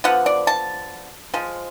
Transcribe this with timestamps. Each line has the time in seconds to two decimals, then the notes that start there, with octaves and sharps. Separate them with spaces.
0.04 D3 F3 B3 F#5
0.26 D5
0.47 A5
1.34 F3 G#3